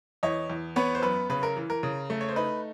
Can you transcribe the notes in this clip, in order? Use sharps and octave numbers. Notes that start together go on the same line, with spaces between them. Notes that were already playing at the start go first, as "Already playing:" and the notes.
E2 C#5 D#5
E2
B3 B4 C#5
C5
F#2 B4
C#3 B4
A#4
E3
A#4
C#3
A3
C#5
C5
D#4 B4